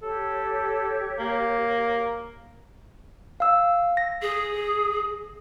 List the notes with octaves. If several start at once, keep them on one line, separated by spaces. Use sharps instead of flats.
G4 A4 C#5
A#3
F5 E6
A#6
G#4